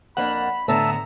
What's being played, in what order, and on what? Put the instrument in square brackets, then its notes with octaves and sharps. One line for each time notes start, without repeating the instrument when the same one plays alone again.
[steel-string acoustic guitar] F2 A#3 D4 [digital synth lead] F#5 [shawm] B5
[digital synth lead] A2 [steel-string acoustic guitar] D3 B3 [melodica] E5 A5 [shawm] A#5